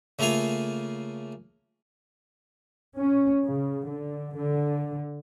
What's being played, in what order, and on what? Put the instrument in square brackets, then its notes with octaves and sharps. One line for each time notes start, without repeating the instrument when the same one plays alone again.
[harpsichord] C#3 A3 A#3 F4 F5 G#5
[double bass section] C#4
C#3
D3
D3